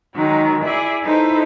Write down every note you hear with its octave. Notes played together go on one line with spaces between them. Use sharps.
D#3 F#3 G#3 D#4
E4 G#4 D5 E5
D#4 E4 A4 B4 C5